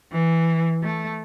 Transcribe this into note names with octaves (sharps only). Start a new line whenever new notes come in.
E3
A3